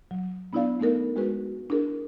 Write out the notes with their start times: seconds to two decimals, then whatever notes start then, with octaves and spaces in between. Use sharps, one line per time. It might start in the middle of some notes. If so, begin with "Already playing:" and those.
0.11 F#3
0.53 B3 D4 E4 G#4 D5 F5
0.80 A3 B3 D#4 A4 A#4
1.16 G#3 F#4 G#4 B4
1.70 D4 E4 G#4 A#4